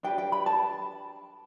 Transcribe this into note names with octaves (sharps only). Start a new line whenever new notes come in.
D4 G4 B4 G5
G5
B5
A5